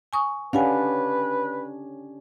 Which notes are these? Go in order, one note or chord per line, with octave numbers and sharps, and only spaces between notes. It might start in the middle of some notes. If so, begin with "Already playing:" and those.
G#5 C#6 D#6
C#4 D4 G4 B4 F5 F#5 G#5